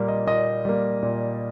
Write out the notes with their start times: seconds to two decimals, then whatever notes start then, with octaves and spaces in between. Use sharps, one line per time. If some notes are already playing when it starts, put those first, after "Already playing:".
Already playing: A#2 G3 A#3
0.08 D#5
0.27 A#2 D#5
0.65 G3 A#3
1.03 A#2